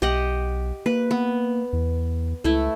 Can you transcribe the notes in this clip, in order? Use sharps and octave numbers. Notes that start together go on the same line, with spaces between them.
B1 G4 D#5 F#5
A#3 B4
B3
E2
C#2 A3 E4